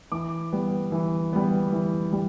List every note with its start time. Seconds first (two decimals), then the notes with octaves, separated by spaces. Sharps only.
0.12 E3 D6
0.53 G3 B3
0.92 E3
1.33 G3 B3
1.72 E3
2.13 G3